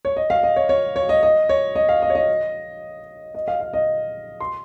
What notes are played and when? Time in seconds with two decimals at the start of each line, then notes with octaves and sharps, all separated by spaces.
0.05 C#5
0.16 D#5
0.30 F5
0.43 D#5
0.56 C#5
0.69 C#5
0.96 C#5
1.09 D#5
1.23 D#5
1.49 C#5
1.75 D#5
1.89 F5
2.02 D#5
2.10 C#5
2.15 D#5
3.35 D#5
3.48 F5
3.60 F5
3.73 D#5
4.40 C6